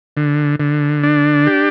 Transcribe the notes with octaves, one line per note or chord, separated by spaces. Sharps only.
D3
D3
D4
G4